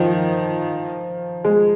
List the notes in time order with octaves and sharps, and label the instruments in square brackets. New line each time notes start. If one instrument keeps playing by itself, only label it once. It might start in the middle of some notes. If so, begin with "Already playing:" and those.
Already playing: [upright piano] D#3 F3
G#3